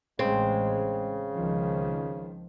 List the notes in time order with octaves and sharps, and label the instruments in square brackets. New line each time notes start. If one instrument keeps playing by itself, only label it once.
[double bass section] A1 G#3 [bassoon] C#3 [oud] C4
[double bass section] C#2 D#3 F3